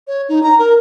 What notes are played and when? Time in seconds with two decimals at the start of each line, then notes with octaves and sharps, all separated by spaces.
0.07 C#5
0.29 D#4
0.43 A#5
0.59 A#4